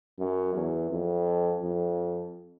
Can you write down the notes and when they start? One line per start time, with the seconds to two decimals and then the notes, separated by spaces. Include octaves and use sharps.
0.19 F#2
0.54 E2
0.90 F2
1.62 F2